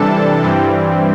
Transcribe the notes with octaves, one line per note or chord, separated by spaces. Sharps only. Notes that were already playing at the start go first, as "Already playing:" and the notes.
Already playing: C3 E3 G3 D4 A4 A5
G2 E3 G3 C4